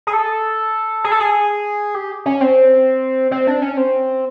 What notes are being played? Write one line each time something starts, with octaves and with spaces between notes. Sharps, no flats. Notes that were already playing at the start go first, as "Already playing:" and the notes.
G#4
A4
G#4
A4
G#4
G4
C#4
C4
C4
D4
C#4
C4